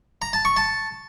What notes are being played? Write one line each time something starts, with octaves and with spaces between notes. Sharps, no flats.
A#5
A5
C#6
A5